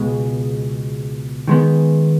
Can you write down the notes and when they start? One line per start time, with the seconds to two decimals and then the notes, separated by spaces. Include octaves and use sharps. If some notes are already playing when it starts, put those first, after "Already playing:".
Already playing: C#2 B2 G#3
1.48 D#3 G#3 B3